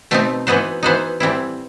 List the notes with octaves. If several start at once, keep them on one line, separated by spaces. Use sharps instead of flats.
B2 A3 C4 D#4
E3 B3 D#4 F#4 C5
E3 B3 D#4 F#4 C5
A2 E3 G3 C4 E4